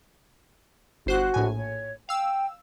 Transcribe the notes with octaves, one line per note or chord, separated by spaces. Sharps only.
G1 F#4 C5 F#6
A#1 A2 G#5
C#5
F5 G5 E6